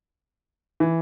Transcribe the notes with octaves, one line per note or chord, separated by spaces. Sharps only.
E3